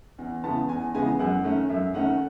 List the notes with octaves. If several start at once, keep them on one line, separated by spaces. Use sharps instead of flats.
E2
C#3 E3 G#3 B3 A5
E2 G#5
C#3 E3 G#3 B3 G#5
F#2 F#5
D#3 A3 C#4
F#2 E5
D#3 A3 C#4 F#5